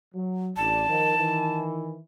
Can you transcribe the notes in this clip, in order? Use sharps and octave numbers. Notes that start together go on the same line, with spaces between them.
F#3
A1 D4 A5
D#3 F3
D#3 E3